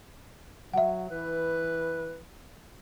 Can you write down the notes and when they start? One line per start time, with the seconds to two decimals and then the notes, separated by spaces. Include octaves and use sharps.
0.73 F#3 E5 F#5
1.11 E3 B4